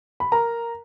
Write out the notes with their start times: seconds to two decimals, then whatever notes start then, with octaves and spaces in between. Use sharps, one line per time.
0.20 B5
0.32 A#4 A#5